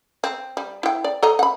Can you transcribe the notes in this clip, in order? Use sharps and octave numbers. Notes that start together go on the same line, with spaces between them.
C4
G3
E4 G5
D5
A4 D#5 A#5
F#5 B5